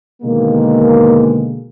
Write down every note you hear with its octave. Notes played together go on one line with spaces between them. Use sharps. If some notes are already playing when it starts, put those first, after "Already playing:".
B2 D3 D#3 G#3 A#3